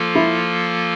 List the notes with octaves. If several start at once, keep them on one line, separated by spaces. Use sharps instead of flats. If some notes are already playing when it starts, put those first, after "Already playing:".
Already playing: F3 A#3 F4 A4
E4